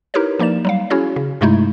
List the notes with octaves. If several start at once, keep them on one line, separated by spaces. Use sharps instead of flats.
D#4 E4 G4 A#4 B4 C#5
F3 A#3 D#4 D5 E7
F#3 G3 F5
C#4 E4 F#4 G#4 C#5
C#3
G2 C3 G#3 A3 D#4 E4